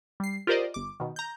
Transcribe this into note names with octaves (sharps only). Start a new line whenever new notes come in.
G3 C7
F4 G4 A#4 C5 D5 D#5
G1 D6
B2 D#3
A#5 G6